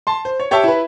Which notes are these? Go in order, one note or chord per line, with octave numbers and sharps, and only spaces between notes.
A5 C6
C5
C#5
G4 C#5 E5 G5 A5 E6
E4 B4